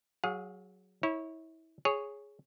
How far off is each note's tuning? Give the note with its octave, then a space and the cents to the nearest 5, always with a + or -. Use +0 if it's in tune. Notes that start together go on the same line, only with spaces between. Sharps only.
F#3 +0 G#4 +0 F5 +40
E4 -30 C#5 -10
G#4 +0 C#5 +0